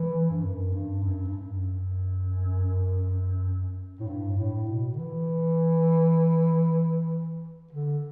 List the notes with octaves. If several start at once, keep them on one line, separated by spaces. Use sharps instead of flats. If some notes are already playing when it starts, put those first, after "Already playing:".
Already playing: E3
G2
F#2
G2
F#2
G2
F#2
A2
G2
A2
B2
D3
E3
D3